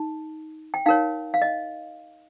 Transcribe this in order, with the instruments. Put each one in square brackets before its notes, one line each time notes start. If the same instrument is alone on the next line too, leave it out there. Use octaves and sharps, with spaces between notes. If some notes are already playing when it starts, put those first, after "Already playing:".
Already playing: [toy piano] D#4
G5
D#4 A#4 C#5 F5
F5
D#5